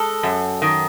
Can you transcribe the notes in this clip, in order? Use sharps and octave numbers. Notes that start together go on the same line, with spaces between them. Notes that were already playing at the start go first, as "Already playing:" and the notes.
Already playing: G#3 A4
F#2
D#3